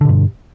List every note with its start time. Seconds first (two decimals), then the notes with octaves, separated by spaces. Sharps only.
0.01 D3
0.05 B2
0.09 G2